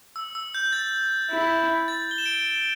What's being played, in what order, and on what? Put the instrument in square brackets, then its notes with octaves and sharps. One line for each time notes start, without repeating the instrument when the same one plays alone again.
[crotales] E6
E6
G6
A6
[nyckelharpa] E4
[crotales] A6
G7
E7
D7